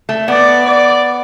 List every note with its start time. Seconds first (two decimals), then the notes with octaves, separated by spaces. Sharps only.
0.09 A3
0.28 B3 D5
0.65 D5